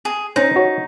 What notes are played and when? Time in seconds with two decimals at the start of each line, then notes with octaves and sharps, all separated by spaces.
0.05 G#4
0.36 C#4 D#4 C5
0.56 F#4 C#5